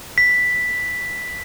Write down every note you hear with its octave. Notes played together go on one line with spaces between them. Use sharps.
B6